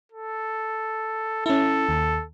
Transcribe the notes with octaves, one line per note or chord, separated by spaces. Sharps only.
A4
C#4 E4 A4
D#2